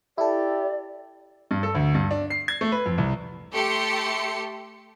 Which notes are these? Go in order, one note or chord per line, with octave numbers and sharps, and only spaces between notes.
E4 G4 A4 D5
G2
A4
D2
G2
D4
C7
G#6
A3
B4
F2
C2
A3 G4 C6 C#7